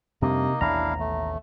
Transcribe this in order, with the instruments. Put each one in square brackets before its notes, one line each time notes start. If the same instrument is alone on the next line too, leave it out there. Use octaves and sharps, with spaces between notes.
[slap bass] F2 G3 D4 [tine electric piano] C3 [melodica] A#3 D#4 D#5
[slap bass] A1 D#2 B2 [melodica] D4 E4 F5 [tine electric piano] A#5
[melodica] A3